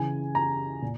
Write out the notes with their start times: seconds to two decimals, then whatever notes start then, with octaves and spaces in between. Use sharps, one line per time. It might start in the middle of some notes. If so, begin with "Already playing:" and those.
Already playing: C#3 E3 G#5
0.35 A#5
0.82 A#2